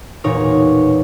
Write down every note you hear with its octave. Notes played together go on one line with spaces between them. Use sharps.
E1 A#2 D#4 C#5